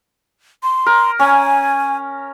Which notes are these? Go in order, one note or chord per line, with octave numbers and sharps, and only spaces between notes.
C6
A#4
C#4 G#5